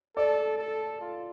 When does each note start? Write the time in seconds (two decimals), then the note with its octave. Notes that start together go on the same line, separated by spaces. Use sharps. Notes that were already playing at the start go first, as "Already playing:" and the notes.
0.17 A4 D5
0.58 A4
1.01 F4